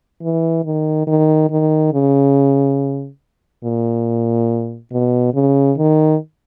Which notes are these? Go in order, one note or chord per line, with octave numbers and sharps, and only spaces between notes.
E3
D#3
D#3
D#3
C#3
A#2
B2
C#3
D#3